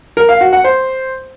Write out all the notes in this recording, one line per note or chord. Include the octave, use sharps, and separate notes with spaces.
A#4
F5
F#4
F#5
C5